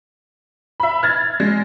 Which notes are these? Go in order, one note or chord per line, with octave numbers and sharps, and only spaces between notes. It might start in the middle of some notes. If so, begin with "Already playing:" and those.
E5 B5
F6 G#6 A6
G#3